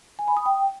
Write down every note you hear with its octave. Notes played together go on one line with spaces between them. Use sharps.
G#5
B5
D#6
G5